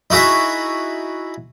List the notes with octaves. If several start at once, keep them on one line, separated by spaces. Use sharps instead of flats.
D#4 E4 F#4 G#4 E5